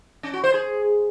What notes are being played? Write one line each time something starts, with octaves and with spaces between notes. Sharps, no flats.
C#4
F#4
C5
G#4